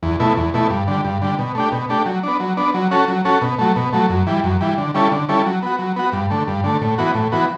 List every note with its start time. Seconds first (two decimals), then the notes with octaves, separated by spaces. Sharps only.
0.03 E2
0.20 B2 A3 E4
0.37 E2
0.54 B2 A3 E4
0.70 G2
0.87 D3 G3
1.04 G2
1.22 D3 G3
1.39 B2
1.55 A3 D4 G4
1.72 B2
1.89 A3 D4 G4
2.06 F#3
2.23 B3 D4
2.40 F#3
2.57 B3 D4
2.74 F#3
2.91 C#4 F#4 A4
3.08 F#3
3.25 C#4 F#4 A4
3.41 B2
3.59 F#3 A3
3.76 B2
3.93 F#3 A3
4.10 F#2
4.27 E3 G3
4.44 F#2
4.61 E3 G3
4.78 D3
4.94 G3 C#4 E4 A4
5.12 D3
5.29 G3 C#4 E4 A4
5.46 F#3
5.62 B3 F#4
5.79 F#3
5.96 B3 F#4
6.13 G2
6.30 D3 A3
6.47 G2
6.64 D3 A3
6.81 A2
6.98 E3 B3 F#4
7.14 A2
7.32 E3 B3 F#4